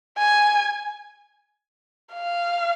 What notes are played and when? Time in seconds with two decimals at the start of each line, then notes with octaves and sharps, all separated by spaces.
0.17 G#5
2.13 F5